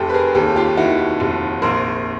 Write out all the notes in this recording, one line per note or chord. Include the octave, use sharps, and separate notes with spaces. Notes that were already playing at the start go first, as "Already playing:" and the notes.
Already playing: F1 G4 A4
B4
G#4 A#4
D#2 G4 A4
F4 G4
D#3 E4 F#4
F1
A#1 A#4 C5